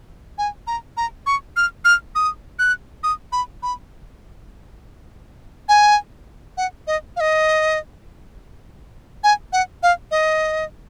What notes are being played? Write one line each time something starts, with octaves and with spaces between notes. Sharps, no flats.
G#5
A#5
A#5
C#6
F6
F6
D#6
F#6
D#6
B5
B5
G#5
F#5
D#5
F5
D#5
G#5
F#5
F5
D#5